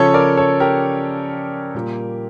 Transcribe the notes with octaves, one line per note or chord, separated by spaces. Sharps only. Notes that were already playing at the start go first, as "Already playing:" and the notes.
Already playing: C#3 F3 C#4 A4 C#5
A#4 D5
A4 C#5
G4 A#4
A#2 G3 A#3